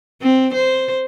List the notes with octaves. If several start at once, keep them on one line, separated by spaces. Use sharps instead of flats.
C4
C5